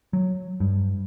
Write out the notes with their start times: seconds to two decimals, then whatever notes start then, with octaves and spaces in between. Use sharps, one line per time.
0.13 F#3
0.60 G2